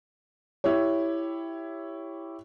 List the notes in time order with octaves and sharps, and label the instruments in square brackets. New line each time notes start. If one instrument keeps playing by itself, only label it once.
[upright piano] E4 G4 C#5